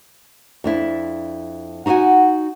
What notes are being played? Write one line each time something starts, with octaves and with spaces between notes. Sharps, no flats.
F2 D4 E4
D#4 F#4 F5 F#5 G#5